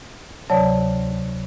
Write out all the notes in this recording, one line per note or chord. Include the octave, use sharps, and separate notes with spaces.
D2 C3 F#3 C#5 D5 A5